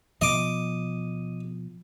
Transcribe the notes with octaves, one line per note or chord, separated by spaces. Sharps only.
B2 F3 D#5 D6